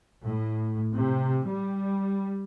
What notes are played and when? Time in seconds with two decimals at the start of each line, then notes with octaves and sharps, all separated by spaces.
0.24 A2
0.93 C3
1.47 G3